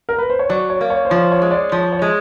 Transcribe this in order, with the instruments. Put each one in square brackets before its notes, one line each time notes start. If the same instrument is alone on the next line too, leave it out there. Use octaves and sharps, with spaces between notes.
[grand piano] A#4
B4
C5
C#5
[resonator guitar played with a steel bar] F#3 [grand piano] D5
[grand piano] C#5
[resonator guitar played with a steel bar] A#3
[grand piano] C#5
C5
[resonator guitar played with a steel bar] F3 [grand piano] C#5
[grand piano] C#5
[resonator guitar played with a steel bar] G#3
[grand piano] D5
[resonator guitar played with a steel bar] F3 [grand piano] C#5
[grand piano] C#5
[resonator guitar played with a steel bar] G#3